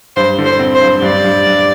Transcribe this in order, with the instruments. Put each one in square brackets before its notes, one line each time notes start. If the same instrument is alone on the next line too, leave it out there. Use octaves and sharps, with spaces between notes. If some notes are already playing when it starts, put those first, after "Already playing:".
[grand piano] G2 [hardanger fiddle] C5
[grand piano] D3
[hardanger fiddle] C5
[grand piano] C4
[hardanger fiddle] C5
[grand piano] G2
[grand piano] G2 [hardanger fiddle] D5
[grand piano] G2
G2